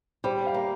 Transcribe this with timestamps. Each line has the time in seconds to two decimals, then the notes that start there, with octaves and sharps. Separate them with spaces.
0.24 G3 C5
0.47 F5
0.54 A#3